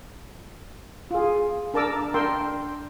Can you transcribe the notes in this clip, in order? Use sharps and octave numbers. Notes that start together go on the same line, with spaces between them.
F4 G#4
D4 A#4 A5 A#5 D6 E6
D4 A#4 G5 C6 E6